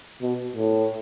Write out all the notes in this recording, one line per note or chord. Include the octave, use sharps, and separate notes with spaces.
B2
A2